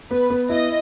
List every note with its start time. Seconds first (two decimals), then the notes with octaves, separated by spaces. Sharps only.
0.10 B3 B4
0.30 B3
0.50 E4 D#5